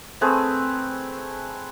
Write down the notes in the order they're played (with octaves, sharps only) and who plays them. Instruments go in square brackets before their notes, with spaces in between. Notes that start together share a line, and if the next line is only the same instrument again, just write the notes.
[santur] A3 C4 G#4 B4